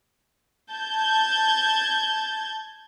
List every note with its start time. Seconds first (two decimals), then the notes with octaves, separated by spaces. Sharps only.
0.71 A5 G6 G#6